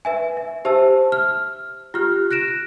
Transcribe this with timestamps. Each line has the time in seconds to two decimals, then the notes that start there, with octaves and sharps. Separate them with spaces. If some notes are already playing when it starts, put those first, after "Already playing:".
0.05 B4 E5 G#5
0.37 E5
0.65 G4 C5 E5 A5 E6
1.12 F6
1.94 F4 G4 F6 F#6
2.31 F#6 A#6 D7 E7